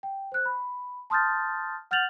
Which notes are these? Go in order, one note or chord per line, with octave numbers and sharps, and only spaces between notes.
G5
C5 F#6
B5
A5 C6 D#6 F6 G6 A6
F#5 F6 G6 A6 F7 F#7